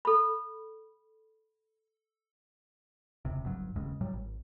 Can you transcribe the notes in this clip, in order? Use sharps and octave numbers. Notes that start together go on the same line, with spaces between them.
A4 B5
E1 C#2 C3
D1 G1 G2 F#3
D1 D#2 C#3 G#3
A2 F#3 G3
G#1